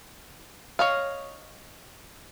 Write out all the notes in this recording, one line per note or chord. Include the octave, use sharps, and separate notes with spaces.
C#5 D#5 F5